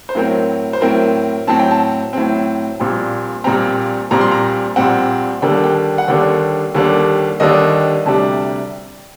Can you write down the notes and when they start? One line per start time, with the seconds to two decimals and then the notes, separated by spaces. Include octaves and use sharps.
0.09 C5
0.15 A2 F#3 C4 A#4
0.73 C5
0.81 A2 F#3 C4 A#4
1.47 A2 F#3 C4 A5
1.59 G5
1.71 A5
2.13 A2 F#3 C4
2.80 A#1 A#2 G3 C4
3.44 A#1 A#2 G3 C4 A#5
4.11 A#1 A#2 G3 C4 A#5
4.21 C6
4.31 A#5
4.76 A#1 A#2 G3 C4 F#5
5.42 D#2 D3 G3 A#3 D4 G5
5.54 A5
5.64 G5
5.98 F#5
6.08 D#2 D3 G3 A#3 D4 G5
6.75 D#2 D3 G3 A#3 D4
7.40 D#2 D3 G3 A#3 D4 D#5
8.05 D2 C3 G3 D4 A5